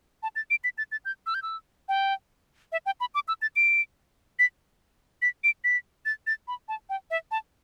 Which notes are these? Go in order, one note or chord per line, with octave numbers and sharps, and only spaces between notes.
A5
A6
D7
B6
A6
A6
G6
E6
G6
E6
G5
E5
G5
B5
D6
E6
A6
D7
B6
B6
D7
B6
A6
A6
B5
A5
G5
E5
A5